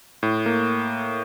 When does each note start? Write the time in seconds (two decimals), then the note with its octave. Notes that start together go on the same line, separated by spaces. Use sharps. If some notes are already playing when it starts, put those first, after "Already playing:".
0.23 A2
0.46 A#3